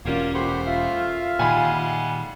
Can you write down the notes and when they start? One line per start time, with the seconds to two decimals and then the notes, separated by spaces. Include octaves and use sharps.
0.05 E1 F#3 G3 A#3 C#4 F4
0.34 A#2 A3 G4 C5 F#5 B5
0.66 F4 E5 F5
1.39 A#2 D#3 G3 G#3 F#5 G#5 B5